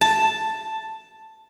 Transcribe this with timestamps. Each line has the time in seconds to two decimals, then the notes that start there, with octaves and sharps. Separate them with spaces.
0.01 A5